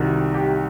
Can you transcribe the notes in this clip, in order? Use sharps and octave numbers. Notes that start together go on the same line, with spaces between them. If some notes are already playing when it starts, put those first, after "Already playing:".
Already playing: C2 C3 D#3 F#4
G4